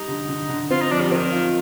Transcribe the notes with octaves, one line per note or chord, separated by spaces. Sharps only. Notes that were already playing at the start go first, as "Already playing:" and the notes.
Already playing: G3 D#4
D3
D3
D3
C4 F4
D#4
F3 D4
G3
D#3 C4
F4